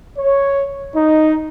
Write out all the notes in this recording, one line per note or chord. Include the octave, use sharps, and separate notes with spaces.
C#5
D#4